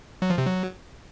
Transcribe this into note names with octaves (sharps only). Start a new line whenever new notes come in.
F#3
F3
C3
F#3